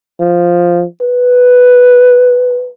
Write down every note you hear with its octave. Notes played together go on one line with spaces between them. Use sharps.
F3
B4